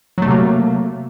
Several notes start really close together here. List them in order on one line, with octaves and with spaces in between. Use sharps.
F#3 A3 C3 A#3